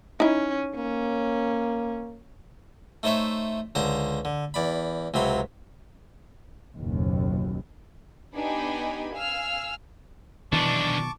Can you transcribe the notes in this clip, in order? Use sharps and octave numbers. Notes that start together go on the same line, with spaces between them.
C#4 D#4 E4
A#3 C#4
A3 D#4 C5 C#5 E5
C#2 D3 C5 A#5 C6
D3
E2 D5 B5
C#2 C3 F#3 B5 C6
F#1 D#2 B2
B3 D4 D#4 G4 G#5 B5
F5 G#5 E6 F6
B2 D#3 E3 F#3 D4 A5 C#6 D6